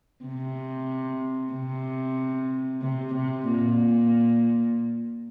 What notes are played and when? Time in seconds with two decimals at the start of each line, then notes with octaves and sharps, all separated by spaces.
0.25 C3
1.53 C3
2.82 C3
3.14 C3
3.47 A#2